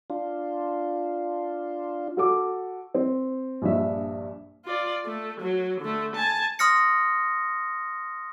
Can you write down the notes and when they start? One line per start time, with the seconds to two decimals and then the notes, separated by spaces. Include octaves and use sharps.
0.10 D4 F4
2.17 F#4 A4 D6
2.94 C4
3.62 A#1 G2 D4 E5
4.65 F4 D5
5.05 A3
5.41 F#3
5.81 D3 A3
6.16 G#5 A5
6.59 C6 D#6 F6 A#6 C#7